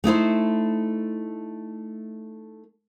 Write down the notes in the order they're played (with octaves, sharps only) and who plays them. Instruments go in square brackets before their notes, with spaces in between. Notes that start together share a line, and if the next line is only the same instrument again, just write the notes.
[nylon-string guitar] A3 D#4 E4 C5